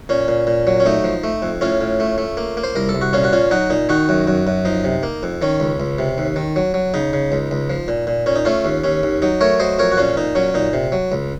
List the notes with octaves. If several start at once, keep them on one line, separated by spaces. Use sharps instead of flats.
A#2 C#4
A#2
A#2
F#3
C#4
A3 D#4
F3
A3
F2
A2 C#4 F4
A2
A3
A3
A#3
A#3
C5
C2 A#4
A4
C2
F#4
A#2 C#4 F4
F#4
A#2 C#4 F4
F#3 D#4 F#4
A#2 D#4
D#3 D#4 F#4
F#2
F#2
F#2
F3 D#4
C3
A#3
F2
D#3 C#4
C#2
C#2
C3
D#2
D#3
F#3
F#3
C#3 D#4
C#3
C#2
C#2
F3
A#2
A#2
A#2 C#4
D#4
A3 C#4 F4
D#2
D#2 C#4
D#2
F#3 D#4
A3 A#4 C#5
F#3 C5 D#5
F2 A#4 C#5
F#4
A#2 C#4 F4
A#2 D#4
F#3 C#4
A#2 D#4
C3
F#3
C#2